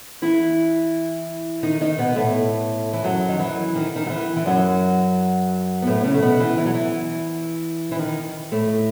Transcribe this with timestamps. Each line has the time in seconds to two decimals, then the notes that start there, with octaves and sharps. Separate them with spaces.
0.22 E3 E4
1.63 D#3 D#4
1.81 D#3 D#4
1.98 B2 B3
2.16 A2 A3
2.93 E3
3.04 F#2 F#3
3.28 D#3
3.39 E3
3.75 D#3
3.96 D#3
4.06 F#3
4.10 E3
4.36 E3
4.46 F#2 F#3
5.82 B3
5.86 A2 A3
5.98 B3
6.04 C#3 C#4
6.14 A3
6.22 B2 B3
6.39 E3
6.57 E3
6.65 F#3
6.74 E3
7.91 E3
7.99 D#3
8.52 A2 A3